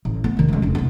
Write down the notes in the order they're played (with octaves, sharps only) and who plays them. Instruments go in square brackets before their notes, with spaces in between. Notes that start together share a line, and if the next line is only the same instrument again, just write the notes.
[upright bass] A1
A3 B3
E1 D#3
C#2 G#3
F1 D4
C2 B3